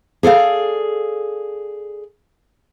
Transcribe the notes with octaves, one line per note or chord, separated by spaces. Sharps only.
G#4 A4 D5 F5